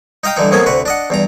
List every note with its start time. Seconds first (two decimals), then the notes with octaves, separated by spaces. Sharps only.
0.24 D#4 D#5 F5 G5 D#6
0.37 G2 D3 E3 D#4
0.51 F2 F#3 A#3 B3 G#4 G#5
0.66 D2 C3 F#4 B4
0.86 D4 D#5 F#5
1.10 E2 G2 A#5